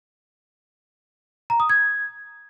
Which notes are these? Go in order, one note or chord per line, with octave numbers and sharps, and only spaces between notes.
A#5
D#6
G#6